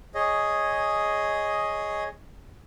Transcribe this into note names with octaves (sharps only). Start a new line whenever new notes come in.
G#4 C#5 D#5